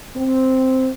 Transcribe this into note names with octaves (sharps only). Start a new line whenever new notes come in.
C4